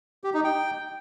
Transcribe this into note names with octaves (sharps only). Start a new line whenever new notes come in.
G4
D#4
G5